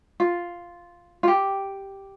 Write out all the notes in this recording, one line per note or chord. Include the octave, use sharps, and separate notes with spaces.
F4
F4
G4